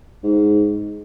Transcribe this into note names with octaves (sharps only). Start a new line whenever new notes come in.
G#2